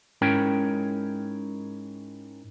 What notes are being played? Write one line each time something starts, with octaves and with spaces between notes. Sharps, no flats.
G#2 C#4 E4 A#4 C#5 G5